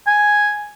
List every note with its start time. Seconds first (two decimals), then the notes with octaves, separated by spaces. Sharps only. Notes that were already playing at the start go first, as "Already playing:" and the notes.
0.07 G#5